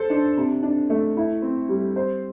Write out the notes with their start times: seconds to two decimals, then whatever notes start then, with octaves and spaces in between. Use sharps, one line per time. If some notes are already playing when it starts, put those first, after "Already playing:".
Already playing: A4 C5
0.10 D4
0.37 C3
0.63 D4
0.90 A3
1.17 E4
1.42 C4
1.69 G3
1.96 C5